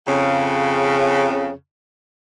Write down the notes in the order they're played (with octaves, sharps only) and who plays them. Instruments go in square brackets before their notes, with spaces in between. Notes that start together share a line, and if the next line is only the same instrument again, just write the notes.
[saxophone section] F2 C#3